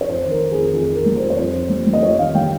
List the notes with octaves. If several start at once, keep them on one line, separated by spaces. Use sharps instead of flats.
C#5
F2 C5
D#3
A#4
D#3
G#4
F2
F2 G#4
F2
A#4
G3
C5
F2
C#5
F2 C5
F2
G3
G3
D#5
F2 C#5
D#3 F5
G3 G5